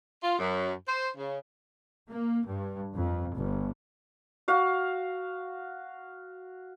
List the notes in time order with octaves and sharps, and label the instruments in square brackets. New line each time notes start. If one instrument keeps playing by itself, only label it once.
[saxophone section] F4
F#2
C5
C#3
[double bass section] A#3
G2
F2
G1
[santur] F#4 F5